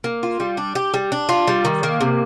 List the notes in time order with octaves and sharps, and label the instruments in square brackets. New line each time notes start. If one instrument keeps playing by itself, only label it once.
[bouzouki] A#3
F4
G3
D4
G4
G3
D4
F4
G3
D#3
A#3
C3